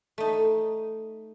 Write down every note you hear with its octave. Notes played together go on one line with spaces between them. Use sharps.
A3 D#4